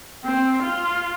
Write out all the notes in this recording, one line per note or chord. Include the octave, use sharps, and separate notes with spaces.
C4
F4